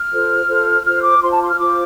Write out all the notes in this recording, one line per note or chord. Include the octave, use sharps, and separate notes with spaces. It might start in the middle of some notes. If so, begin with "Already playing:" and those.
Already playing: F6
F4 A4 C5
F4 A4 C5
F4 C5 F6
D6
F4 C5 C6
A5
C6
F6
F4 C5 D6